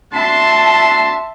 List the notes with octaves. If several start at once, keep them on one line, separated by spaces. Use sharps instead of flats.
D4 F#4 E5 A5 C6